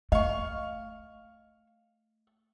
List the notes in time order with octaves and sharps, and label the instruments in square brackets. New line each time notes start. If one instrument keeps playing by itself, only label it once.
[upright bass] A3 [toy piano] D#5 [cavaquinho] F5 C#6